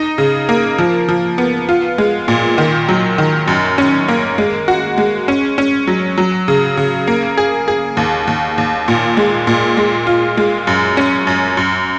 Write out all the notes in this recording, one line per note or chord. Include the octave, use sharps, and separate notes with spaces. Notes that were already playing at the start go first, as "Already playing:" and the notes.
Already playing: D#4
C#3
A#3
F3
F3
B3
F4
G#3
A#2
D#3
F#3
D#3
F#2
C#4
A#3
G#3
F#4
G#3
C#4
C#4
F#3
F#3
C#3
C#3
A#3
G#4
G#4
D#2
D#2
D#2
A#2
G#3
A#2
G#3
F4
G#3
F#2
C#4
F#2
F#2